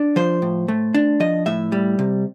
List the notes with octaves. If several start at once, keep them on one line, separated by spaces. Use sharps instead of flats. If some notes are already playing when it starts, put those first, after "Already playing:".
Already playing: D4
F3 C5
A2
A3
D4
F3 D#5
A2 E5
G3
C3